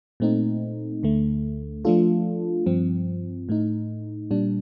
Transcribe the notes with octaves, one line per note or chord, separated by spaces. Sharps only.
A#2 A3 C4 D#4
D2 D3 A3
F3 A3 D4 F4 A4
G2 F3 C4
A2 A3 D#4
A#2 G3 D4